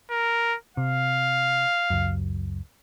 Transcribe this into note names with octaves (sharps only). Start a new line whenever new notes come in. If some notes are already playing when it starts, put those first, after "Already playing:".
A#4
C3 F5
C#2 F#2